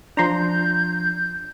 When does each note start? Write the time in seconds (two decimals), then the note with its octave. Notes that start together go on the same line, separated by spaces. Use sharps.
0.17 F3 D4 A#5 C6 G6